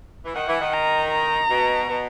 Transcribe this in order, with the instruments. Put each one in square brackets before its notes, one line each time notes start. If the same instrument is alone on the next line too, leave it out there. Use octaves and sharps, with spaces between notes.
[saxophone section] E3
[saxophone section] D#3 [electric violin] F#5
[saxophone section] E3
D#3
[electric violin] A#5
A#5
[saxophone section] B2
B2